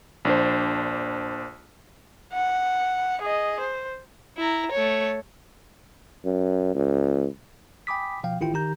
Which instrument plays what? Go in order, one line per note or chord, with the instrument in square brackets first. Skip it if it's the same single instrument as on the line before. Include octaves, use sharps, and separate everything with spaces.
[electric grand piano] A#1 D4 C5
[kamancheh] F#5
G#4 D#5
C5
[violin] E4 A#5
A3 C#5
[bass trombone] F#2
C#2
[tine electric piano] G5 G#5 B5 D6 D#6 B6
B2 F3 F5 G5
A1 D#3 E4 F4 G5
D#3 G4 A#5 G6